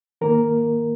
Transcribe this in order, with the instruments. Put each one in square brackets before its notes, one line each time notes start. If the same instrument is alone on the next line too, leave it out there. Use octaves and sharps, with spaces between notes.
[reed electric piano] D#3 A#3 A#4